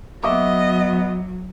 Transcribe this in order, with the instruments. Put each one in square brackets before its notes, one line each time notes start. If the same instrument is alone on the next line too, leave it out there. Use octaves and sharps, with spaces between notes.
[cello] F#3 [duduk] B3 [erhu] D#5 [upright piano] E5 C#6 D6